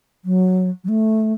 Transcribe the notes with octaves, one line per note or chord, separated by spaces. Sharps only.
F#3
F#3
A3